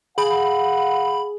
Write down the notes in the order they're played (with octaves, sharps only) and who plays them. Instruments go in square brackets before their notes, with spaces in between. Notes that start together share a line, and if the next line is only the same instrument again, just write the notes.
[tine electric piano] G#4 [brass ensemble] F5 F#5 [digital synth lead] B5